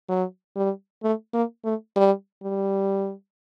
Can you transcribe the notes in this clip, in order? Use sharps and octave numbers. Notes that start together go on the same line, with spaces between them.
F#3
G3
A3
A#3
A3
G3
G3